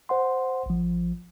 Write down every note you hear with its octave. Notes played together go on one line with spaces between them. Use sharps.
C5 F#5 C6
A1 F3